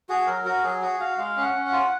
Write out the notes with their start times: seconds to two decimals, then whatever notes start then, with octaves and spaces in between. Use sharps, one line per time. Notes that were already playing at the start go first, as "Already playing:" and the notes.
0.09 F#4 G#4
0.27 F#3 A#4
0.45 F#4 A#4
0.63 F#3 G#4
0.82 F#4 G#4
1.00 F#4 F5
1.18 G#3 F5
1.37 C#4
1.42 F#5
1.54 C#4
1.66 F#5
1.72 F4